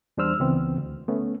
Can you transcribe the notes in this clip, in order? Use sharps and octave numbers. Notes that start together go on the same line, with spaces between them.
E2 G3 D4 C5 E6 F6
C#2 E3 B3 C4
D2
A3 B3 C#4